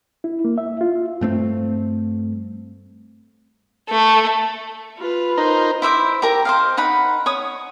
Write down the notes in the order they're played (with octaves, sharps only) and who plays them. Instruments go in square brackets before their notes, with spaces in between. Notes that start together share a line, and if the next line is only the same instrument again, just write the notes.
[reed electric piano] E4
A#3
E5
F4
[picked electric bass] G2 A3 C4
[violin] A3
[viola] F4 B4
[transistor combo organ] D#4 A#4 C5
[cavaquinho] E4 C5 E5 D6
G4 A#4 A#5
C5 D#5 F5
D#4 F#5 B5
C#5 C#6 D#6